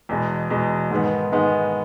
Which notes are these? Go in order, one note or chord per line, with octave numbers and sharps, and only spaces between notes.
E2 B2 G#3
E2 B2 G#3
G#2 D#3 G#3 B3
G#2 D#3 G#3 B3